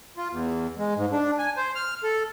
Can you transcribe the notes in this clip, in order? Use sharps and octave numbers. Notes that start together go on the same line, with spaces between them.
F4
E2
G#3
G#2
D4
G#5
C5
F6
A4